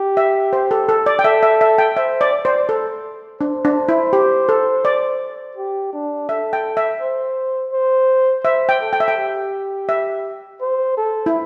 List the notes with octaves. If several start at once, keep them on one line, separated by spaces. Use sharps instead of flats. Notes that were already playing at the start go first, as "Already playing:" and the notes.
Already playing: G4
E5
C5
A4
A4
D5
G5
A4 E5
E5
E5
G5
C5 E5
D5
D5
C5
A4
D4 C5
D4
E4
G4
A4
D5
G4
D4
A4 E5
G5
E5
C5
C5
C5 E5
G5
A4
G5
E5
G5
G4
E5
C5
A4
E4